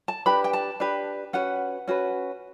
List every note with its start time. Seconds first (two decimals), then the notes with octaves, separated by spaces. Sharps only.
0.08 A5
0.26 D4 G4 B4 B5
0.44 G5
0.53 A5
0.80 D4 G4 B4
1.33 C#4 F#4 B4 F#5
1.88 C#4 F#4 B4